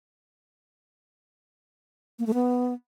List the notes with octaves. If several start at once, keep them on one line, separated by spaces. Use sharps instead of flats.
A#3
A3
B3